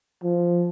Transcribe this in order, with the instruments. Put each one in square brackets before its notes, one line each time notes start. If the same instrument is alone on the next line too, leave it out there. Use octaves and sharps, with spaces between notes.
[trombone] F3